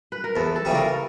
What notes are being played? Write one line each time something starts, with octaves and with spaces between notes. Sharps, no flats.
B4
A#4
E2 A4
A4
C#3 E3 G3
A#4